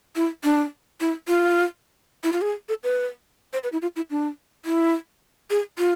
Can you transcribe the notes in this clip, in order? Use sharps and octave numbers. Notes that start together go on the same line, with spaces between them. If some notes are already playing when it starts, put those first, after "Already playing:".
E4
D4
E4
F4
E4
F4
G#4
A4
B4
C5
B4
E4
F4
E4
D4
E4
G#4
F4